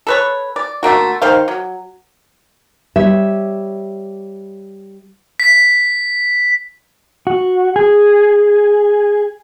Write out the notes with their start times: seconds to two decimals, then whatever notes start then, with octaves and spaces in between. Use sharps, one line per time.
0.07 A4 B4 C#5
0.56 D5
0.83 D3 A3 A#3 F#4
1.22 D#3 C5 F5
1.48 F#3
2.96 G3 C#5 E5
5.40 B6
7.27 F#4
7.76 G#4